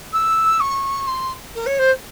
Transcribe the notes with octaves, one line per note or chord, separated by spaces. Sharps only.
E6
C#6
C6
A#4
C#5
C5